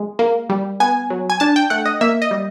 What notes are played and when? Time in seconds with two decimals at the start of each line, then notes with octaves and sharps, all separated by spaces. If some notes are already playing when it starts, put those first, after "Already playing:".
Already playing: G#3
0.19 A#3
0.49 G3
0.80 B3 G#5
1.10 F#3
1.30 G#5
1.40 D4 A5
1.56 G5
1.70 A3 F#5
1.86 D#5
2.01 A#3 E5
2.22 D#5
2.31 G3